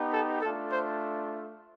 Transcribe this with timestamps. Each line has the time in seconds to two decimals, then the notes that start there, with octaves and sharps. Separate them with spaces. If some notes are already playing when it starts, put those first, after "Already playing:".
Already playing: B3 D#4 G4
0.12 A4
0.41 A3 D4 F4 A4
0.70 C5